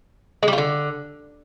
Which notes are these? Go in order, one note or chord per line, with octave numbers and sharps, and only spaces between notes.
G#3
G3
F4
D3